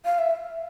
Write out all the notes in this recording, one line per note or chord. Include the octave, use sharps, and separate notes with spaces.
F5
E5